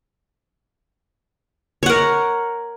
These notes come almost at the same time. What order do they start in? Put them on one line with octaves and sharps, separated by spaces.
C#5 F#5 A#4